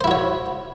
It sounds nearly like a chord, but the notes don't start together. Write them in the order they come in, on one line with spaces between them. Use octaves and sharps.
C5 E4 F#4 C#5